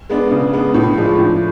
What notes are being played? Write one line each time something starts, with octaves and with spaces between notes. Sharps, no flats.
G#3 B3 D4
C#3
G#3 B3 D4
A2
F3 G#3 D4
A2